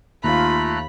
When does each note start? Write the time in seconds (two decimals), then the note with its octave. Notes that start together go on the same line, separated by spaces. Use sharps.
0.24 D#2 A3 F4 F5 A#5 B5 F#6